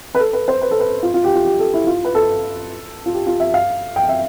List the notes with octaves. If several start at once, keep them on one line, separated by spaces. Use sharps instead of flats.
B4
A4
B4
C5
B4
A4
B4
F4
F4
G4
F4
G4
A4
E4
F4
B4
A4
F4
G4
F4
E5
F5
G5
E5